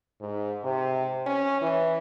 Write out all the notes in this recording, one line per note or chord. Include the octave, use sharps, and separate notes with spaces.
G#2
C3
C#4
E3